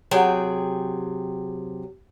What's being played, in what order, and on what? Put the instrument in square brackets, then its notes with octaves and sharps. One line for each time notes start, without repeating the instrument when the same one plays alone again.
[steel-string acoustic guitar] C3 F#3 G#4 G5